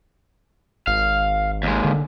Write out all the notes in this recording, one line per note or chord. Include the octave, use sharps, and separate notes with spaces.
G#1 F5
D#2 G#3
D3